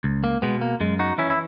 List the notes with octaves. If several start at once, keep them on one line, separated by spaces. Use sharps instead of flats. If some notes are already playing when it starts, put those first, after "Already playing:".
C#2
A#3
B2 G#3 B3
A#3
F#2 G#3
D#4 F#4
E3 C#4 E4
E4